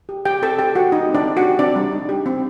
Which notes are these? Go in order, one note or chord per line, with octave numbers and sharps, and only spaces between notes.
G4
G4 G5
C4 A4 A5
C4 G4 G5
F#4 G4 F#5
D#4 G4 D#5
C4
D4 D5
C4
F#4 F#5
G4
C4 D4 D5
G3
D#4
G4
C4